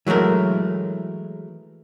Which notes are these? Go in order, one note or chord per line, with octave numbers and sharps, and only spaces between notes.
E3 F#3 G#3 A3 A#4